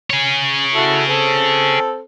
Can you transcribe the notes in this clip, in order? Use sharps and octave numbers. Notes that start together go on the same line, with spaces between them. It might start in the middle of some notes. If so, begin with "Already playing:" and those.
G#4 C#5
E4 F#4 A4
C4 A4